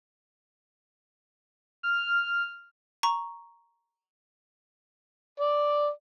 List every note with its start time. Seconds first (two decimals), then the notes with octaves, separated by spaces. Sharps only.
1.83 F6
3.03 A#5 C#6
5.40 D5